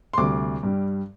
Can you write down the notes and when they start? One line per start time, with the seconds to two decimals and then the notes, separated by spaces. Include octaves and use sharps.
0.13 C6
0.18 D2 C3 G3 D6
0.63 G2 G3